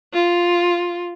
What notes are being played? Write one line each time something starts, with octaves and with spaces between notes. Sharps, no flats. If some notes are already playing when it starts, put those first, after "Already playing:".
F4